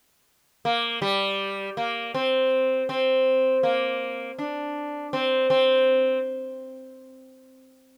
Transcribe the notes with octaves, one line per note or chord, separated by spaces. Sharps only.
A#3
G3
A#3
C4
C4
A#3
D4
C4
C4